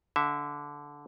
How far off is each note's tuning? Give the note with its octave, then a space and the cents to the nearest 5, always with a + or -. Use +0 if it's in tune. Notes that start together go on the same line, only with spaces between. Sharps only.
D3 -15 E5 +0